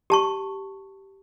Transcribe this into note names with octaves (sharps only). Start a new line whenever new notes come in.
G4 A5 C#6